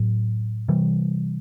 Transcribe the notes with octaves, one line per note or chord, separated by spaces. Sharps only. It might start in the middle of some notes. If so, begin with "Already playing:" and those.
Already playing: A2 F#3
C3 E3 G3